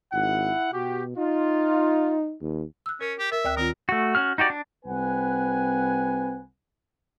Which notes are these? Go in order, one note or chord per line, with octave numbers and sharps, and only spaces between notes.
G#1 E4 F#5
B2 F#4 G4
D#4 F4
D#2
E6 F#6
C#4 A#4
G4
A#4 E5
D2 G5 F#6
D#3 C4 F4 A#4
A3 F#4
C#4 F#4 F6
D#4 F#4 G4 D5
D4
C2 C4 B4 F#5 G#5